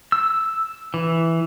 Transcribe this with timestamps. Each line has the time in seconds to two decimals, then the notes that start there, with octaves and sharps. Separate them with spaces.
0.12 E6
0.94 E3